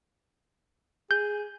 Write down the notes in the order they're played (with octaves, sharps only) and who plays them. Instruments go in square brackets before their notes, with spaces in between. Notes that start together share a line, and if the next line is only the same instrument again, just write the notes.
[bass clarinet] G#4 [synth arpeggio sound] G6